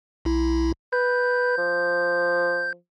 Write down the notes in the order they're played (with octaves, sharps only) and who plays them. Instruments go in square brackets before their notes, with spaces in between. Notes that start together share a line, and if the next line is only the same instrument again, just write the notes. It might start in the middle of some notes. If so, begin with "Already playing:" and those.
[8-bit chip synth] B1 E4
[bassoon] B4 [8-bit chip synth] G6
[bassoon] F3